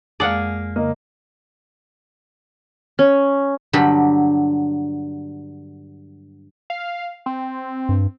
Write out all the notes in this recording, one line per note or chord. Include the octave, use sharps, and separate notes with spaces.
F2 G#3 A#3 G#4 D5 F#5
C#3 A#3 D#5
C#4
G2 D3 F#3 G4 B5
F5
C4
G2